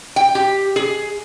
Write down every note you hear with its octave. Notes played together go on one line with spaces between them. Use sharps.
G5
G4
G#4